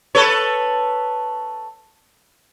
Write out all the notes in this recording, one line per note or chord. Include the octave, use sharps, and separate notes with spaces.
A4 B4 C#5